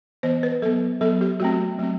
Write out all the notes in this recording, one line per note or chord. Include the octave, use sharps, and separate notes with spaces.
E3 B3 C5
B4
F#3 B3 A4
F#3 B3 A4
G4
F#3 A3 C4 F#4
F#3 A3 C4